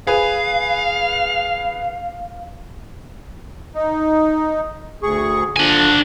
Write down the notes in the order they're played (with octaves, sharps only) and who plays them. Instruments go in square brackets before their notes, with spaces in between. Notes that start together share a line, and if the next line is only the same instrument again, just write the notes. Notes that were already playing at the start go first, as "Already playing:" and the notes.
[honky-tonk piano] G#4 B4 [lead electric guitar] F5
[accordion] D#4
D2 G#4 C#6
[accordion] D3 F3 [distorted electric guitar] D4 G#5